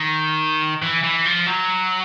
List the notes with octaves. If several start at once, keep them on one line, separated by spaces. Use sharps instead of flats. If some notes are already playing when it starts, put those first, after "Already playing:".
Already playing: D#3
E3
E3
F3
F#3